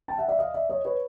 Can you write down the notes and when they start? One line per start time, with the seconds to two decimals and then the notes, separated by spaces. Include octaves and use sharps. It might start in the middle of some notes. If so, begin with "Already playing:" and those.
0.08 G5 A5
0.18 E5 F#5
0.28 D5 E5
0.39 D#5 F5
0.54 D5 E5
0.69 C#5 D#5
0.85 B4 C#5